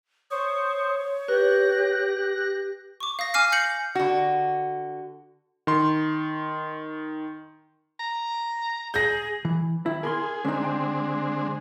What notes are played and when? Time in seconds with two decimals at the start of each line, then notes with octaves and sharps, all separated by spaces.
0.31 C5 C#5 C#6 D#6
1.28 G4 B4 F#6 A#6
3.00 C#6 D6
3.19 F5 D#6 A#6
3.34 G#5 D6 F6 C7
3.52 G6 A#6 C7 C#7 F#7
3.95 D3 F#4
5.67 D#3 C6
8.00 A#5
8.94 G#4 G6 A#6
9.45 E3
9.86 D#3 E4
10.03 G#4 A#4 B5 C6
10.45 D3 G#3 C4 C#4 D#4
10.64 G5